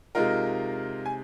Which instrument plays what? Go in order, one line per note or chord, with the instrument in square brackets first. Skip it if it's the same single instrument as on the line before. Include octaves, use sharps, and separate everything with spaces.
[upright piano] C3 G#3 D#4 F4 A#4
G#5